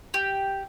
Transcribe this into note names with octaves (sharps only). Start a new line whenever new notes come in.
G4